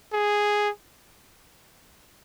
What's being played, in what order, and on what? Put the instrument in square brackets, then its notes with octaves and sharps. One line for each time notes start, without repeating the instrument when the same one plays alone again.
[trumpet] G#4